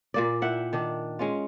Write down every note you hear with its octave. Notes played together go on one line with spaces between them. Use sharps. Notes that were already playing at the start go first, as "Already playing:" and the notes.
A#2 A#3 D5
E4 E5 F#5 G5
D#3 D4 D5
G#3 C#4 F4